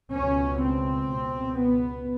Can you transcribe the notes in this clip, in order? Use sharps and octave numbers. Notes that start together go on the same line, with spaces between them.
C#2 B2 C#4
C4
C#2 B2
B3